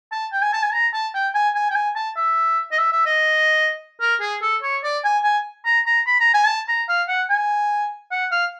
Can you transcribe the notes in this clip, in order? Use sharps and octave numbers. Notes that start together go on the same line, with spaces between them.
A5
G5
G#5
A5
G#5
A#5
A5
G5
G#5
G#5
G5
G#5
A5
E5
D#5
E5
E5
D#5
A#4
G#4
A4
C#5
D5
G#5
G#5
A#5
A#5
B5
A#5
G#5
A5
A#5
F5
F#5
G#5
F#5
F5